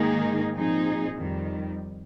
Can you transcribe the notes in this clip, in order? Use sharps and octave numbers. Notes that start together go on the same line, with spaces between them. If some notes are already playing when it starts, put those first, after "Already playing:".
Already playing: G#2 D#3 A#3 D#4 G#4
A#2 F3 C4 D#4 G#4
F2 D#3 G3